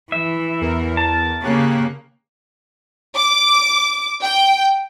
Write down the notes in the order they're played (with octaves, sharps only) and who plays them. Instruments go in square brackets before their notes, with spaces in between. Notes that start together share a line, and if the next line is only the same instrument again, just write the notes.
[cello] E3 [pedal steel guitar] E5
[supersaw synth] E2 A#4
[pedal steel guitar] A5
[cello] C#3 A#3 [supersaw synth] G4 C#5 F#6
[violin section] D6
G5